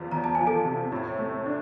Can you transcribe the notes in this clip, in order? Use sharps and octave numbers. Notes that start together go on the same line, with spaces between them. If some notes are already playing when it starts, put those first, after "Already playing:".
Already playing: E2 F3
E2 A#5
A5
F3 G#5
A4 A5
C3
A2
A3
D4